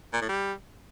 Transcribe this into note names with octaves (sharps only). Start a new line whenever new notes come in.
A#2
A2
G3